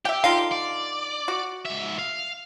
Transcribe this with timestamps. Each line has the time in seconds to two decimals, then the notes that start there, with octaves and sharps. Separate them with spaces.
0.05 G4 E5 G5
0.24 D3 D#4 F4 F5
0.52 D5
1.28 F#4
1.66 G#2 E5
1.99 F5